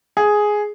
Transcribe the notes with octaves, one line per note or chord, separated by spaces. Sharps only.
G#4